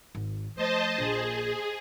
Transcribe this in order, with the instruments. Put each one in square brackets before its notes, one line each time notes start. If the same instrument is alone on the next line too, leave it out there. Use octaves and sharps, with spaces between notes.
[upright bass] G#1
[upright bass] F3 A3 [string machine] C5 D#5 A5
[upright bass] A#1 [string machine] G#4